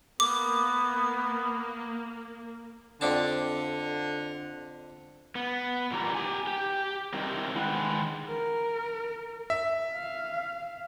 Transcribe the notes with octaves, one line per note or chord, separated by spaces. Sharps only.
A#3 B3 D6
F2 D3 D4 A5
B3
A#2 E3 G3 A#5
G4 G#5
G4
G3 C4 D#4 E4 A#4
D#3 G#3 B4 F#5 G5
A#4
E5
F5